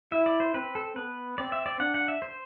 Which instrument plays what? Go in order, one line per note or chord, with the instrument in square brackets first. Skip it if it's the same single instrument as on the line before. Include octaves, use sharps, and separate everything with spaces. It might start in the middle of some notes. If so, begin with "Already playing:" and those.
[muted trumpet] E4 [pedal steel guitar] E5
[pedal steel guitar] D5
C5
[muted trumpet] C4 [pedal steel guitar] B4
[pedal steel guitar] A4
[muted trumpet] B3 [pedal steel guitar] B4
[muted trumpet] C4 [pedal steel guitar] D5
[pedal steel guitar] E5
D5
[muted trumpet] D4 [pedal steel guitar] F#5
[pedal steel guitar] F#5
E5
C5